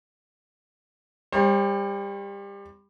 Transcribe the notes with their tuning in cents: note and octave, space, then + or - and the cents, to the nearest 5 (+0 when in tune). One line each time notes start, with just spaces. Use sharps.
G3 +25 C5 +45